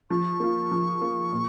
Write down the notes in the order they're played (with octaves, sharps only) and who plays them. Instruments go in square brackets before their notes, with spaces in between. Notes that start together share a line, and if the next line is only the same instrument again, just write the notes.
[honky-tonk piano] F3 [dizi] C#6
[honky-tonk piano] A#3 F4
F3
A#3 F4
A#2